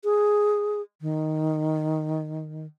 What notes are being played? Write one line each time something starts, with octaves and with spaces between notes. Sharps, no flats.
G#4
D#3